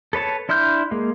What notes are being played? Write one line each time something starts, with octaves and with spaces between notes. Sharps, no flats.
A4 B4 C#5 A5
D4 E4 C6 F6 G6
G#3 A#3